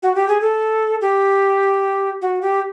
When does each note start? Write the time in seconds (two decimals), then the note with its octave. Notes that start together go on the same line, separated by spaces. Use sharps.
0.03 F#4
0.15 G4
0.28 G#4
0.41 A4
1.01 G4
2.22 F#4
2.42 G4